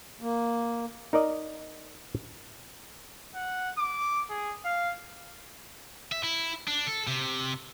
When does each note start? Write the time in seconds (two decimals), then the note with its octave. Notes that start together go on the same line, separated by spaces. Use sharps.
0.21 A#3
1.13 D#4 A#4 D5 D#5
3.35 F#5
3.78 D6
4.30 G#4
4.65 F5
6.12 E5
6.23 E4
6.68 D4
6.87 A4
7.07 C3